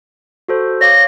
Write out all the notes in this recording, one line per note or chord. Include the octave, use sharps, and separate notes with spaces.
F#4 A4 C5
C#5 F5 D6 A#6